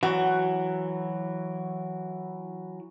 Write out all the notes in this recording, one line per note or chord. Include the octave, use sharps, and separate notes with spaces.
E3 F#3 F#4